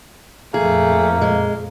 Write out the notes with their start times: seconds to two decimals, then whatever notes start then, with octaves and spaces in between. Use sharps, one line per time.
0.54 F2 A#2 A3 A#3 G#4
1.21 G#3